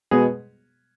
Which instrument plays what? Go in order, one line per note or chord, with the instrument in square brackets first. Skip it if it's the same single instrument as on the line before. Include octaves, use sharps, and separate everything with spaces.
[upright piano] B2 G#3 B3 G#4